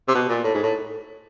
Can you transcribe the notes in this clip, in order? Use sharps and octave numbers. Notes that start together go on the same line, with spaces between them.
C3
B2
A#2
A2
G#2
A2